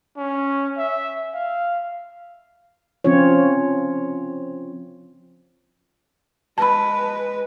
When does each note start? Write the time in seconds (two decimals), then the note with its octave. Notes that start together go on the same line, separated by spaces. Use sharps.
0.17 C#4
0.78 E5
1.34 F5
3.04 F3 C4 C#4 F4 C#5
6.58 G#3 B4 A5 B5